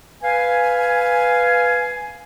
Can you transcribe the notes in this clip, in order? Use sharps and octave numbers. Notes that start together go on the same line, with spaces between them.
B4 F5 G#5